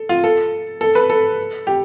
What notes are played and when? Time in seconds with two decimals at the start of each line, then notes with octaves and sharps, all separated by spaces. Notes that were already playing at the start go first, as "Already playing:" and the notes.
Already playing: A4
0.09 F4
0.24 A4
0.81 A4
0.95 B4
1.10 A4
1.67 G4